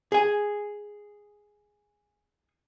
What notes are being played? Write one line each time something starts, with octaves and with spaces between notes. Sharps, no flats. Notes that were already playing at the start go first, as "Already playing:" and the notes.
G#4 G#5